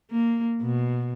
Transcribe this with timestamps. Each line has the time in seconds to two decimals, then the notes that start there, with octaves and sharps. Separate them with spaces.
0.11 A#3
0.61 B2